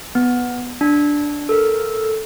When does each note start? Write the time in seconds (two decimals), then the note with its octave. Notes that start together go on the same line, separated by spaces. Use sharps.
0.15 B3
0.81 D4
1.49 A4 A#4